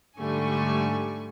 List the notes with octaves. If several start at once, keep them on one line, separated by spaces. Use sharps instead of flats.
G#2 D3 G3 A3 G#5 C#6